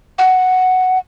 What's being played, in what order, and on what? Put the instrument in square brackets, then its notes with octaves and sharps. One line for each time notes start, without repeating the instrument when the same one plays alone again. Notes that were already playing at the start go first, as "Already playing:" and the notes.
[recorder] F#5